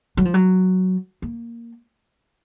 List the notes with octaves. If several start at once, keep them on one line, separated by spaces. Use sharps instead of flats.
F#3
F3
F#3
A#3